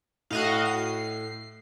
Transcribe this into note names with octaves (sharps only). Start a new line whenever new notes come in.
A2 F#4 D#5 F5
C7